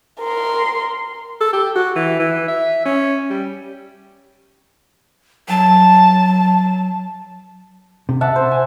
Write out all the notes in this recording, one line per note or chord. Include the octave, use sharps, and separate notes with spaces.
A#4 C6
A4
G4
F#4
E3
E3
E5
C#4
G3
F#3 A5
C3
E5 F#5 A5
C5
G#5